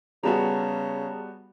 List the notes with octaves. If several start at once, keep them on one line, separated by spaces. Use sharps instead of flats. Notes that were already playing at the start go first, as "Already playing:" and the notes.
C#3 G3 B3 F#4 G#4 A5 A#5